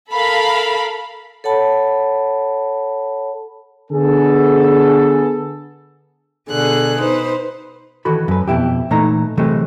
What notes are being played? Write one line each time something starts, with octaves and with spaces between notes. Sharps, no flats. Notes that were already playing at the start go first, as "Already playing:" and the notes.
A4 A#4 F5 B5
A4 C#5 F#5 A5 B5
D3 B3 G#4 A4
B2 D3 G#4 F#6
D#4 B4 C5
D#3 E3 F#4 A4 B5
F#2 B4
F2 B2 E4 G4
A#2 E3 A3 D#4 A#5
C3 E3 F#3 G#3 A3